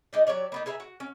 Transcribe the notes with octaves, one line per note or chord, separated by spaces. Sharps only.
G#3 D#4 D5
F#3 G4 C#5 D5
A#3 B3 D#4
G#4 B4 E5 A#5
F#4
C#4